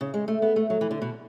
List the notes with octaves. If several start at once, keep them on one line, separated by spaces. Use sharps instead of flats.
C#3
G#3
A3
B3
A3
F#3
E3
D3
B2